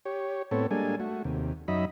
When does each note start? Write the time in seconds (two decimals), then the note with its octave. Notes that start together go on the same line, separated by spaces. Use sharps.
0.05 G4 C#5
0.51 A2 B3 C4 A4 C#5
0.71 G3 G#3 A#3 D4 A4 G#5
1.00 A3 F#4
1.24 D#2 C3
1.68 F#2 F#3 D#4 D#5 E5 B5